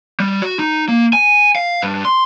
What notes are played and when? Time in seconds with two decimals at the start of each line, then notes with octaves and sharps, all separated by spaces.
0.20 G3
0.42 F#4
0.59 D#4
0.88 A#3
1.13 G#5
1.55 F5
1.82 G2
2.05 C6